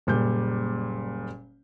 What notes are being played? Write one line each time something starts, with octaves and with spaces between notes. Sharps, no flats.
F#1 A#2 G3 G6